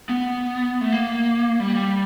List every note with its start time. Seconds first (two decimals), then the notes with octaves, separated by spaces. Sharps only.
0.09 B3
0.81 A3
0.92 A#3
1.60 G3
1.75 G3